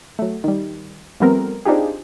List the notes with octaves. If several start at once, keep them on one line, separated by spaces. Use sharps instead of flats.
F#3 A3
D#3 G3
F3 G3 A3 B3 C4 A#4
C4 D4 D#4 F4 G4 G#4